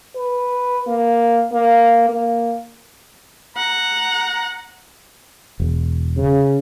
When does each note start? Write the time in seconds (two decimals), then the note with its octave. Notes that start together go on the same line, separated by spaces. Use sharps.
0.16 B4
0.87 A#3
1.53 A#3
2.09 A#3
3.57 F#5 A#5
5.60 E1
6.17 C#3